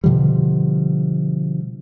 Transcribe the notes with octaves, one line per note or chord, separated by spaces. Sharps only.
B2 D3 F3 G3